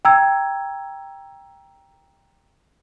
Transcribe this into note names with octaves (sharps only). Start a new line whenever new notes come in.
G5 A#5 E6 G#6